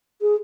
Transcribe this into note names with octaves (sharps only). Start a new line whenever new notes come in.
G#4